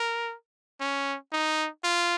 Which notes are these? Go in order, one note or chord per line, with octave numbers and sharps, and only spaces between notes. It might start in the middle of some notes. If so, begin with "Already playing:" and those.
Already playing: A#4
C#4
D#4
F4